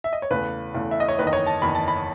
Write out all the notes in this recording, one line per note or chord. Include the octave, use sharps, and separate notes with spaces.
E5
D#5
C#5
E2 C#3 E3 A3 B4
E2 C#3 E3 A3
E5
D#5
C#5
F#1 E2 D#3 B4
D#5
C#5
A5
F#1 E2 D#3 B5
A5
B5